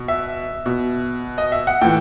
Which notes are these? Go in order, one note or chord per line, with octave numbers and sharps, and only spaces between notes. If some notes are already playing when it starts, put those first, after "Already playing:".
Already playing: B2
E5
B2
D#5
E5
F#5
A2 E3 G5